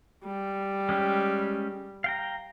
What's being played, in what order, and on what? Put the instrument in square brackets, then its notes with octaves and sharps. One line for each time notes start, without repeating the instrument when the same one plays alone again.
[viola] G3
[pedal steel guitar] G#3 C#4 G4
F5 G5 A#5